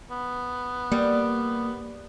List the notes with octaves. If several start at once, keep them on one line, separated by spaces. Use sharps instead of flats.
B3
G3 A#3